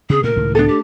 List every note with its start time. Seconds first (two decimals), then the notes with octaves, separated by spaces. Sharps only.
0.10 C#3 C4 G#4
0.24 A#2 C#3 A3 A#4
0.36 C#2 A2 D#3
0.55 B3 D4 A4
0.68 A3 G4